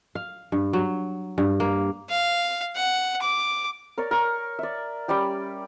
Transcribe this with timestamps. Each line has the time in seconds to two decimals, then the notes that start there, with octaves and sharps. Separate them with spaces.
0.15 F5
0.52 G2
0.73 F#3
1.38 G2
1.60 A#3
2.10 F5
2.76 F#5
3.22 D6
3.98 A#4 C#5 D5
4.11 A#4 C#6
4.59 D5 E5
5.08 G3 C#4 D5 G5